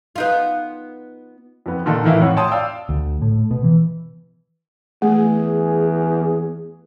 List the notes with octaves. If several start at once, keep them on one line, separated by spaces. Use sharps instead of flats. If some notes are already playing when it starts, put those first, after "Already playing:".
B3 D#4 F4
F2 B3
A#2 D3 D#3 A4
A2 D#3 E3 E4 F5
F2 A2 C#5 F#5
C#5 G5 A5 C6 D#6
D5 F5 G5 E6
D2
A2
B2
E3
E2 A3 G#4